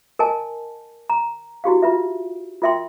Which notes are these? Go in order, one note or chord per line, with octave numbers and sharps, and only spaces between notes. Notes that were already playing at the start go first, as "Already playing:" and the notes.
A#4 D#5 G#5 A5
A#5
E4 F#4 G4 F5
F4 B4 E5
F4 A#4 E5 G5 C6